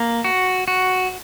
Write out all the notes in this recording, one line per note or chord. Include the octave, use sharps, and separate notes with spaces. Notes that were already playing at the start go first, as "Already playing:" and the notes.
Already playing: A#3
F#4
F#4